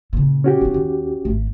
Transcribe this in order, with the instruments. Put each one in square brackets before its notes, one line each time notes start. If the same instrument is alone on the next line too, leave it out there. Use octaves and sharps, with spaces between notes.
[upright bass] A#2 C#3
[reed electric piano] C#4 F#4 G4
[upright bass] C4 E4
D#2
G#1 A3